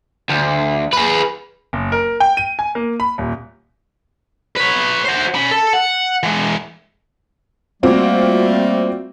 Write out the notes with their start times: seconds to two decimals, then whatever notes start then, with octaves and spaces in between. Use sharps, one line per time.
0.30 D2
0.93 G#4 B4
1.73 F#1
1.92 A#4
2.20 G5
2.37 D#7
2.59 G#5
2.75 A#3
3.00 B5
3.18 D#1
4.57 B4 C#5
5.05 F#4 C5
5.34 C#4 B5
5.51 A4
5.73 F#5
6.23 E3 G#3
7.83 G3 A3 A#3 C4 F4 F#4